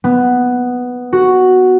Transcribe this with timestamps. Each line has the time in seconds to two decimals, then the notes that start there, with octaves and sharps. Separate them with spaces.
0.04 B3
1.13 F#4